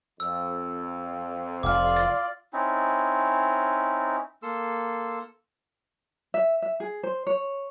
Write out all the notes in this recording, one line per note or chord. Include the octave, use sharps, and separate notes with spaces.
F2 E6
F1 F4 D5 D6 F6
A6
C4 C#4 D#4 E4
A#3 A4 C6 E6
E5
E5
G#4
C5
C#5